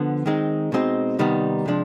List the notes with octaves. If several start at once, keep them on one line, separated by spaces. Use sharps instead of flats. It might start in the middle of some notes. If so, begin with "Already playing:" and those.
Already playing: D3 F3 B3
D#3 G#3 C4 D#4
B2 G#3 C4 D#4
C3 D#3 G3 B3 D#4
C3 F3 G#3 D4